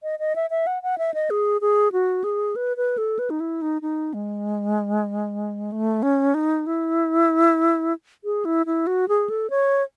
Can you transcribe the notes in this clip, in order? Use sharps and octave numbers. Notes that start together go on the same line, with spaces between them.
D#5
D#5
E5
E5
F#5
F#5
E5
D#5
G#4
G#4
F#4
G#4
B4
B4
A4
B4
D#4
E4
D#4
D#4
G#3
A3
C#4
D#4
E4
G#4
E4
E4
F#4
G#4
A4
C#5